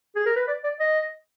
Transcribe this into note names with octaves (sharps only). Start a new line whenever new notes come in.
G#4
A#4
B4
D5
D5
D#5